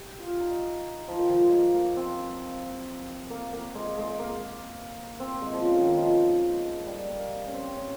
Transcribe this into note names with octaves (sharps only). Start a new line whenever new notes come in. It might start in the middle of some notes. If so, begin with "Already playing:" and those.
Already playing: G4
F4
D#4
F3
D#3
F3
G#3
A#3
A#3
C4
A#3
A#3
G#3
G#3
A#3
C4
G#3
F3
C#3
D#3
D#3
F3
G3
A#3
C#4
C4
C#4